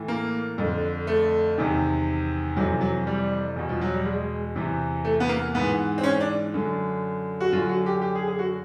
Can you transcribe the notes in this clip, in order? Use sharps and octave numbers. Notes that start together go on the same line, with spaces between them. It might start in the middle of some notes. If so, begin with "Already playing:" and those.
Already playing: A2 E3
A#3
F2 D3
A3
E2 C3 D#3
F2 C3 E3 F#3
F#3
G3
E2 B2
F3
F#3
G3
G#3
E2 C3 E3
A3
B3
A#3
G#2 E3 B3
C4
C#4
D4
F#2 D3
F#4
F#2 D3 F4
F#4
G4
G4
G#4
G#4
F#4